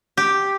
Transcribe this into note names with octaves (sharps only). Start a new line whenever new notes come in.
G4